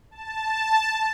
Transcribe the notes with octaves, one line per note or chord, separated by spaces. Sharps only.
A5